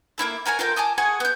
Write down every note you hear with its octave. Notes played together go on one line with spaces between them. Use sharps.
A#3 C#4 E4 A4
F#4 A#4 C#5 G#5
F4 A4 A#4 G5
G#5 A5 D6 D#6
G#4 F#5 G#5 C#6
B3 G6